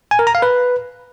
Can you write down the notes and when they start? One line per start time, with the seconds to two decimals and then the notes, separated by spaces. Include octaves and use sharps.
0.11 G#5
0.19 A#4
0.27 A#5
0.35 F5
0.42 B4